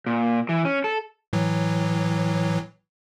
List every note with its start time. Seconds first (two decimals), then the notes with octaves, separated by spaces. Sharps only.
0.06 A#2
0.49 E3
0.65 C#4
0.84 A4
1.33 A2 E3 F#3